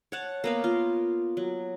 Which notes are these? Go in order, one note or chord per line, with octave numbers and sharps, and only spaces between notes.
C#5 F#5 A5
A#3 B3 F5
F4
F#3